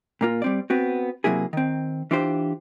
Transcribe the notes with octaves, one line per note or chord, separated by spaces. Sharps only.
A#2 A#3 F4
G3 C4 D5
B3 C4 F#4
C3 D#3 F#3 A#3 E4 G#4
D#3 C4
E3 D4 F4 G4 C5